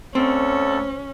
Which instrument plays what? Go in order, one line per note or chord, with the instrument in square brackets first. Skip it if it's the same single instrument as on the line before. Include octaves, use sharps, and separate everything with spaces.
[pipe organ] D2 A4 [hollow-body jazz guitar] C4 [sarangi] C#4